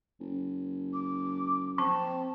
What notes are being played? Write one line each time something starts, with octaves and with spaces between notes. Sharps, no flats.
F#1
D6
C4 A5 C#6